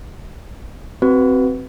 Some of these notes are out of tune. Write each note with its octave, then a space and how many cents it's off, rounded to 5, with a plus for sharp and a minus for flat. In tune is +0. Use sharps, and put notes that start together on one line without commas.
C4 +0 F#4 +25 B4 +0